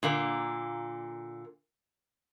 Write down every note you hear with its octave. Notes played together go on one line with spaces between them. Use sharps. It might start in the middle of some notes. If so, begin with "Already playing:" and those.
A#2 D3 A#3